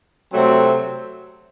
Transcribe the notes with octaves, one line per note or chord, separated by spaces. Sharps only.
C3 F#3 A3 C4